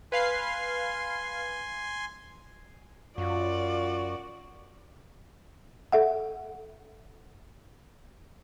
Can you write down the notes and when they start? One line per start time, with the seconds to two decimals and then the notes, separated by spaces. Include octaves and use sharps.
0.12 B4 F5 G#5 C6 C7
3.18 F#2 F4 F#4 D5
5.92 A4 E5 F#5